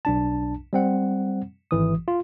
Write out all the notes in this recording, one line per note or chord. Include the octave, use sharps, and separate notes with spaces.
B1 D4 A5
G3 C4 F#5
G#1 E3 D#6
F4